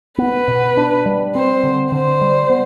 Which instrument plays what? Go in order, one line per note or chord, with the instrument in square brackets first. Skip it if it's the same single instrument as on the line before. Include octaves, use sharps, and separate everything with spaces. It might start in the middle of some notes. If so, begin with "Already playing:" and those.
[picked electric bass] B3 [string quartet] B4
[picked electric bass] B2
D4
G3
[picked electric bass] C4 [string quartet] C5
[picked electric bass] D3
[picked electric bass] D3 [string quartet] C5
[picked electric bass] G3
B3